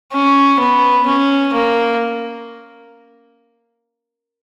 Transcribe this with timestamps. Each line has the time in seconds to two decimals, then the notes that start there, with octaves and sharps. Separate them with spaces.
0.12 C#4
0.59 B3
1.06 C#4
1.53 A#3